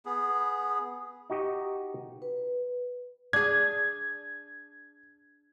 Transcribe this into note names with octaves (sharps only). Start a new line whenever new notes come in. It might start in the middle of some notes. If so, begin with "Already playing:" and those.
B3 G#4
D#4 F#4 G4 D#5
B4
D4 G#4 G#6